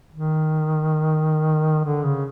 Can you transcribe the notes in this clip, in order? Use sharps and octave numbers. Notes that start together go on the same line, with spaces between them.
D#3
D3
C#3